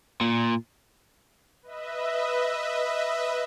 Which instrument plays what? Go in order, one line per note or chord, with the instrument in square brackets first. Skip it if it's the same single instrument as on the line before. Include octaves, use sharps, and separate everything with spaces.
[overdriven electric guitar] A#2
[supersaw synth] B4 D#5 E5